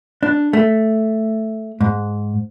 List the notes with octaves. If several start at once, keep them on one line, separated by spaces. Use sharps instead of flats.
D4
A3
G#2